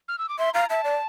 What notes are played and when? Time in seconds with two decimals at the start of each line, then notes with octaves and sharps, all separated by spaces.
0.08 F6
0.18 E6
0.29 D6
0.39 E5 C6
0.54 F5 A#5
0.69 E5 A5
0.84 D5